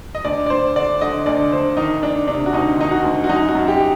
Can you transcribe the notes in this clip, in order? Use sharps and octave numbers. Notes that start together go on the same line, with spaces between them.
D#5
D2 D5
D5
D2 C5
D3 D5
D3 D#5
D2 D5
D2 C5
D#3 D#4
D2 D4
C3 D4
F#4
D2 D#4
D#3 D#4
F#4
D2
F#4
F#2 D#4
F#4
F#2
G4
G4